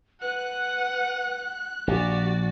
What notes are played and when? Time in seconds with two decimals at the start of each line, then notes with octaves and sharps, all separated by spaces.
0.22 B4 F#5 F#6
1.87 A#1 F#4 G4 D5